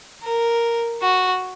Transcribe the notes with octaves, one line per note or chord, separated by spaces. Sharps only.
A#4
F#4